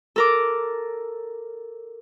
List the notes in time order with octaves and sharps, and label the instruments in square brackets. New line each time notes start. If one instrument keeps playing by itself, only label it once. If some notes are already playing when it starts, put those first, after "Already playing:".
[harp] A4 A#4 D6